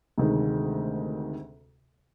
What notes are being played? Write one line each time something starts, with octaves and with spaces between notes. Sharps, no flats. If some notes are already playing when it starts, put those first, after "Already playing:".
D2 C3 D#3 G#3